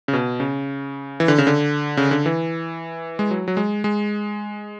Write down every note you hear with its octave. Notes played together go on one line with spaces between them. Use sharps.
C#3
B2
C#3
E3
D3
C#3
D3
C#3
D3
E3
G#3
F#3
F#3
G#3
G#3